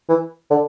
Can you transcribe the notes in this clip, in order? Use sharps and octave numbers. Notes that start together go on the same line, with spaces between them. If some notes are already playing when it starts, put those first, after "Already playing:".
E3
D3